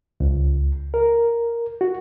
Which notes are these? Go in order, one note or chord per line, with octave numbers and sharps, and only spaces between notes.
C#2
A#4
F#4